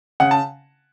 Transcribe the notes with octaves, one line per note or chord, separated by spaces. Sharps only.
C#3 F#5
A5